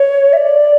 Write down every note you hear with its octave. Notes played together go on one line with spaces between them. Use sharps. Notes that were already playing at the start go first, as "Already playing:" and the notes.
Already playing: C#5
E5
D5